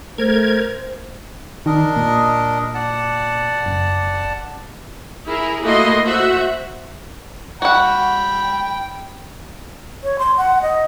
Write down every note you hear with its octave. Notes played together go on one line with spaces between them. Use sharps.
A3 A#4 C5 G#6
D#3 D4 A#4 D#5
A#2
D5 F#5 A5
F#1
E4 G#4 A#4
A3 A#3 E4 F#4 D#5 C6
F#4 C5 E5 F#5
F#4 F#5 G5 B5
C#5
C6
F#5
D#5